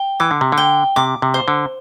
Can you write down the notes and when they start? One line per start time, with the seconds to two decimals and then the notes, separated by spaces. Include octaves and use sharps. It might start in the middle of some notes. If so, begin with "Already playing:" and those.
Already playing: G5
0.20 E3 D6
0.31 D3
0.41 C3
0.52 D3
0.57 G5
0.96 C3 D6
1.22 C3
1.34 C5
1.48 D3